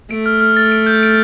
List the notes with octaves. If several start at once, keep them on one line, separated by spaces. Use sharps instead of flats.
A3 D7
F6
F6
A6
D7
G6
D7